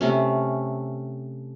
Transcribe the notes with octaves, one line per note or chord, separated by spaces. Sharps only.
C3 A3 C#4